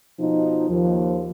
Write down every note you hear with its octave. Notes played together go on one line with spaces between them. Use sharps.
B2 F3 D#4
D#2 F3